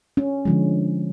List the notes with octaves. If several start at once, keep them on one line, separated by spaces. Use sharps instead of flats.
C#4
D3 F3 G#3